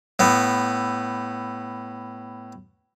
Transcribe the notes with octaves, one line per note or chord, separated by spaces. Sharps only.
A2 B3